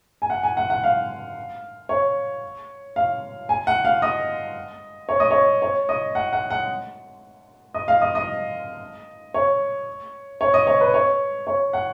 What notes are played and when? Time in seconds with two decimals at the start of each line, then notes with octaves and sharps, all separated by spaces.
0.22 G#5
0.30 F#5
0.43 G#5
0.57 F#5
0.70 F#5
0.84 F5
1.89 C#5
2.96 F5
3.49 G#5
3.67 F#5
3.85 F5
4.02 D#5
5.09 C#5
5.20 D#5
5.31 C#5
5.62 C#5
5.89 D#5
6.15 F#5
6.33 F#5
6.50 F#5
7.74 D#5
7.88 F5
8.01 D#5
8.15 D#5
9.34 C#5
10.41 C#5
10.54 D#5
10.67 C#5
10.81 B4
10.94 C#5
11.47 C#5
11.73 F#5